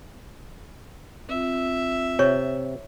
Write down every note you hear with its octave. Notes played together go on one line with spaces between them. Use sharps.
C4 F4 E5
C3 C#5 C#6